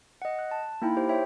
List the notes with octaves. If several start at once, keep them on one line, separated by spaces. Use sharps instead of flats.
D#5 F#5
F#6
A5
A#3 D#4 E4 G5 B5
G4 C5
C5 C#5 E5 G5